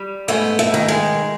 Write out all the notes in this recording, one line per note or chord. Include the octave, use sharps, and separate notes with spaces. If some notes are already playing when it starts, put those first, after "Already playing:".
Already playing: G3
G#2 A3 B3
A3
D#3
G#3